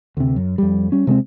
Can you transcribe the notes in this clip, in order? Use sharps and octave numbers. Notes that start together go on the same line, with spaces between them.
D2 C3
F#2
F2 G3
G3 C#4
C3 G#3 A3 C4